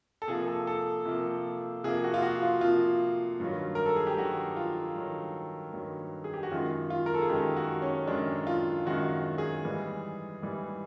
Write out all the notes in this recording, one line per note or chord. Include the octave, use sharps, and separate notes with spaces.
A4
C3 F3 A#3 G#4
A4
A4
C3 F3 A#3
C3 F3 A#3 G#4
F#4
F4
F#4
F4
C3 F3 A#3 F4
G2 D#3 F#3
A#4
A4
G#4
G4
G2 D#3 F#3 F#4
F4
G2 D#3 F#3
G2 D#3 F#3
G#4
G4
F#4
F#2 D#3 G#3 F4
F4
A#4
A4
G#4
F#2 D#3 G#3 G4
F#4
C#4
F#2 D#3 G#3 D4
F4
F#2 D#3 G#3 F#4
G#4
G#2 E3 G3
G#2 E3 G3